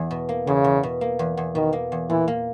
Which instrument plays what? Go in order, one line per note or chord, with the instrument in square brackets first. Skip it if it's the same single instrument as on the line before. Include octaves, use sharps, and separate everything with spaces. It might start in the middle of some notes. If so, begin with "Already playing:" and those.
Already playing: [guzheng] E2
B2
A#3
[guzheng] E2 [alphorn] C#3
[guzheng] E2
B2
A#3
E2
E2
[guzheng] B2 [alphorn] D#3
[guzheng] A#3
E2
[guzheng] A#2 [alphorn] E3
[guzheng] A#3